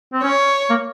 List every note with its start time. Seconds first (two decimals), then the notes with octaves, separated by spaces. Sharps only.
0.13 C4
0.23 C#4 C#5
0.70 A#3